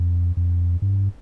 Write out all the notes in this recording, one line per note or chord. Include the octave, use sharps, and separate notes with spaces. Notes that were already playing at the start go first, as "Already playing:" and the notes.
Already playing: F2
F2
G2